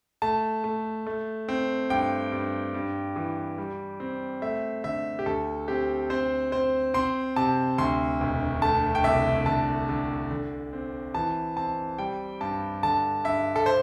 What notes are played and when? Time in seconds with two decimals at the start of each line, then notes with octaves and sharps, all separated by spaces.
0.22 A3 A5
0.64 A3
1.06 A3
1.48 C4
1.90 G2 G5
2.32 G2
2.74 G2
3.16 E3
3.58 G3
4.00 C4
4.42 A3 E5
4.84 D3 E5
5.19 G4
5.26 D2 A4
5.68 C4 G4
6.10 C4 C5
6.52 C4 C5
6.94 C4 C6
7.36 C3 A5
7.78 D2 C6
8.20 E1
8.62 A3 A5
8.95 G5
9.04 C2 E5
9.46 D3 A5
9.89 D3
10.31 D3
10.73 C4
11.14 E3 A5
11.56 C4 A5
11.98 G3 G5
12.41 G2 A5
12.83 D3 A5
13.24 G2 E5
13.56 A4
13.66 C5